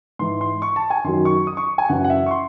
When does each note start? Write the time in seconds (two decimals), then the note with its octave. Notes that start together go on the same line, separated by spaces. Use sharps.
0.19 G#2 E3 C6
0.41 C6
0.62 C#6
0.76 A5
0.90 G#5
1.04 F#2 D#3 F#3 C6
1.25 C#6
1.47 D#6
1.57 C#6
1.78 G#5
1.89 F#2 C#3 E3 F#5
2.04 F#5
2.10 E5
2.26 C#6
2.31 C6